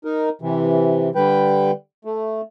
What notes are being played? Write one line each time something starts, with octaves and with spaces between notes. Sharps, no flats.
D#4 A#4
C3 E3
D3 G3 B4 G5
A3